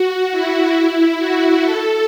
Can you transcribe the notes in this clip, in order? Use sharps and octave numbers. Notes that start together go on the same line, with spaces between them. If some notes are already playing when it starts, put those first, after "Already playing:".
Already playing: F#4
E4
F#4
A4